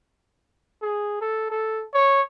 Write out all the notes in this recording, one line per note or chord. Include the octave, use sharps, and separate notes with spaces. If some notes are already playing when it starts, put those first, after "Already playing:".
G#4
A4
A4
C#5